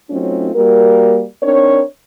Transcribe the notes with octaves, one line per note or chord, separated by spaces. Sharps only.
F#3 A3 C4 C#4 D#4 F4
G3 A#3 F#4 A#4
C4 D4 D#4 A#4 C#5